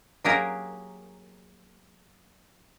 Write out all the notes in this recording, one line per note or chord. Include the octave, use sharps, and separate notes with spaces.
F#3 A#3 G4 G#4 A#4